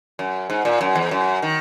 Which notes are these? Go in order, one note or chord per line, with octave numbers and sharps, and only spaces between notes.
F#2
G#2
A#2
F#2
E2
F#2
D#3